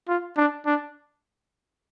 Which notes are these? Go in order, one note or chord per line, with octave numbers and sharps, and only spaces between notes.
F4
D4
D4